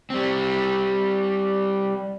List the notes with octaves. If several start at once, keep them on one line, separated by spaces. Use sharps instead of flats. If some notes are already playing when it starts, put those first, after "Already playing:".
G3 C4